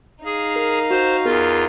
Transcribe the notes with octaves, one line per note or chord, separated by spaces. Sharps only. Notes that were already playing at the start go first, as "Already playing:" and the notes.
D#4 G#4 F5
A#4
F#4 C5
E2 B3 F4 G#4 A#4